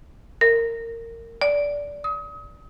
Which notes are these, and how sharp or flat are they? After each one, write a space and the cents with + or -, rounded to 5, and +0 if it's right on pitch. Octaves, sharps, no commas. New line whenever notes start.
A#4 -20
D5 -15
D#6 +35